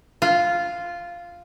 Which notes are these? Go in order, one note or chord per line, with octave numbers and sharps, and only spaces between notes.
F4